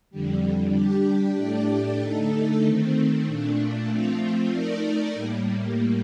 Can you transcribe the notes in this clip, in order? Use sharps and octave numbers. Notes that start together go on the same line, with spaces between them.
F2 D3 G3
G3 D4 G4
A2 A3 D4 G4 D5
D3 A3 D#4 A4
D#3 A3 C4
A#2 A3 D4
F3 A3 C4 F4
A3 D#4 A#4 D5
A2 G3 A#3